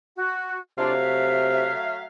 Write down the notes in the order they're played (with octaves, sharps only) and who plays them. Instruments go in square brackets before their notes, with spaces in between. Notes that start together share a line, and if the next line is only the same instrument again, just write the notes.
[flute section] F#4
[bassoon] C3 [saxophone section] F#3 A3 F5 [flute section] D4 F4
[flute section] E5